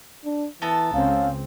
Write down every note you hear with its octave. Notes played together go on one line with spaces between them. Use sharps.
D4
E3 B3 A4 A#5
C#2 C4 C#4 F5